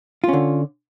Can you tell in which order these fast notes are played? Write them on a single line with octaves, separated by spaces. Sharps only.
F4 C#4 D3